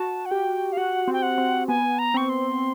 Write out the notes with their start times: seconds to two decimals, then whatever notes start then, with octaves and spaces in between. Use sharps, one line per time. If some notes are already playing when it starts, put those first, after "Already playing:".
Already playing: F#4 A5
0.26 F#5
0.31 G4 G5
0.72 F5
0.77 F#4 F#5
1.08 C4
1.13 G5
1.22 F#5
1.38 C4
1.68 B3 G#5
1.99 A#5
2.14 C4 C#6
2.29 C6